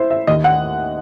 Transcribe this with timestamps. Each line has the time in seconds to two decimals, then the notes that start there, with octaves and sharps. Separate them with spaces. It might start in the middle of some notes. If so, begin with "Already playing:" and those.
Already playing: E4 C5 E5
0.10 E5
0.27 D#2 D#5
0.44 F#5